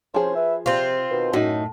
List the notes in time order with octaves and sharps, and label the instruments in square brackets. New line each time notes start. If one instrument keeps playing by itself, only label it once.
[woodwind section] C2 C#4 C5 [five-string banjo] F3 G#4
[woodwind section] B4 E5
[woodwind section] C3 [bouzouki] C4 F4
[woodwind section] B2 D#3
[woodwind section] F#2 [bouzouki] A2 [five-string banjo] D#4 F#4